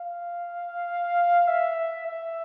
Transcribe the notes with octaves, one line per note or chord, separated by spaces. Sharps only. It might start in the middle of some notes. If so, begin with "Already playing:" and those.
Already playing: F5
E5
E5